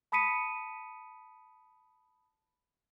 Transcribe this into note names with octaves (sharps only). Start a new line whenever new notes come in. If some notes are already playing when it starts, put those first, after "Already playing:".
A5 B5 D#6 B6 C#7 D#7